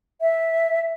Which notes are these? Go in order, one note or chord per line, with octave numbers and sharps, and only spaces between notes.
E5